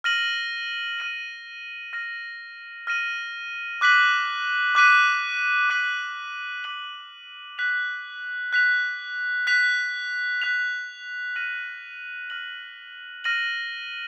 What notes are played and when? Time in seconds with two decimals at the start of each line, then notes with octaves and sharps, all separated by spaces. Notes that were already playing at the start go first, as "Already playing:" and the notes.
0.04 F6 A#6 D#7 F#7
0.99 F6 A#6 D#7 F#7
1.93 F6 A#6 D#7 F#7
2.87 F6 A#6 D#7 F#7
3.81 D6 F#6 B6 D#7 F#7
4.75 D6 F#6 B6 D#7 F#7
5.70 D6 F#6 B6 D#7 F#7
6.64 D6 F#6 B6 D#7 F#7
7.58 F#6 B6 F7
8.53 F#6 B6 F7
9.47 F#6 B6 F7
10.42 F#6 B6 F7
11.35 F6 A#6 D#7 F#7
12.30 F6 A#6 D#7 F#7
13.24 F6 A#6 D#7 F#7